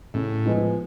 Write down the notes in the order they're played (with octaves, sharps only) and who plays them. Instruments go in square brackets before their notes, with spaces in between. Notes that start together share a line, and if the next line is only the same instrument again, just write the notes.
[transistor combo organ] A2 [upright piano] C#3
[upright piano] F3 G#3 B3